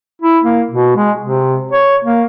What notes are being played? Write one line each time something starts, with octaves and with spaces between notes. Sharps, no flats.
E4
A#3
B2
G#3
C3
C#5
A#3